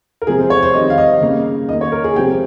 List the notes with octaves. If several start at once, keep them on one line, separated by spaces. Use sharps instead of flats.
A#4
C3 F3 G#3 C4 G#4
C5
C#5
C5
D#3 G3 C4 D#5
F5
D#5
C#3 G3 A#3
D#3 A#3 D#5
C#5
A#4
G#4
C3 F3 G#3 C4 G4